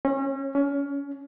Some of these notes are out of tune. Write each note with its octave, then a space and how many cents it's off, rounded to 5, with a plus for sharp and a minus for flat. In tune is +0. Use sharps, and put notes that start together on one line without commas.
C#4 -30
C#4 +25